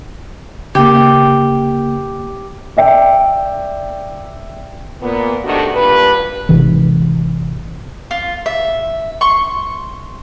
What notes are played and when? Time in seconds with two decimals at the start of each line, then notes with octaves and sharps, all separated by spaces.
0.75 C#3 A#3 G4
2.77 D5 E5 G5
5.01 A#2 B3
5.45 C3 D#3 A3 D4 F#4
5.75 G2 A#2 B4
6.49 G#1 G#2 C3 E3
8.11 F4
8.46 E5
9.21 C6 C#6